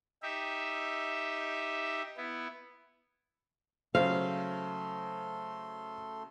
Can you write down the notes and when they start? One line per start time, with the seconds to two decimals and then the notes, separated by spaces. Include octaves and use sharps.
0.23 D#4 G4 E5
2.17 B3 E4
3.95 C#3 F#3 A3 A4 C5 F5 C6